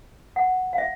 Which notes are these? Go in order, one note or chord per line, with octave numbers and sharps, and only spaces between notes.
F#5
F5
E5